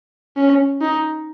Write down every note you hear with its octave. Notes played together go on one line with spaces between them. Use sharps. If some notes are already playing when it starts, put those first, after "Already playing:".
C#4
D#4